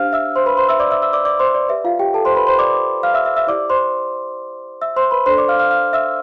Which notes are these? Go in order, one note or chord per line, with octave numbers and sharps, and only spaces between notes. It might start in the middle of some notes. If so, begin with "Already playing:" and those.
Already playing: D4 G4 C5 F5 F6
E5 E6
C5 C6
B4 B5
C5 C6
E5 E6
D5 D6
E5 E6
E5 E6
D5 D6
D5 D6
C5 C6
D5
G4 B4 D5 E5
F4 F5
G4 G5
A4 A5
C5 C6
B4 B5
C5 C6
D5 D6
F5 F6
E5 E6
E5 E6
E5 E6
E4 G4 C5 D5 D6
C5 C6
E5 E6
C5 C6
B4 B5
D4 A4 C5 D5 C6
D5 D6
F5 F6
F5 F6
F5 F6
E5 E6